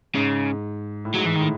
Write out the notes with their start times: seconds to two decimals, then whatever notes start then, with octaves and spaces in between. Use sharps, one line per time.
0.14 G#2 C#3
1.05 A2
1.15 G#2 F#3
1.26 E3
1.36 A2 D#3